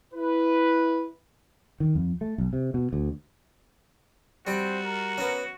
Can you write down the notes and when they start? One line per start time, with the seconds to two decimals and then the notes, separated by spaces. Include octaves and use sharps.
0.14 E4 B4
1.80 D#3
1.95 F2
2.21 A3
2.38 B1
2.53 C3
2.74 B2
2.93 D2
4.47 G3 C4 F#4 G5
4.84 A#4
5.18 B3 C#4